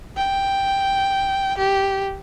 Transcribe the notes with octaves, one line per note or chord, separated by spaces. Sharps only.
G5
G4